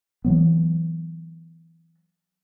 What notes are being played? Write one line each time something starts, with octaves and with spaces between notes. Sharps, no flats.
E3 F#3 B3